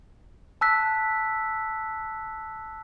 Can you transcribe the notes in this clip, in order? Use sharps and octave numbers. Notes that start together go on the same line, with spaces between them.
A5 E6 F#6 B6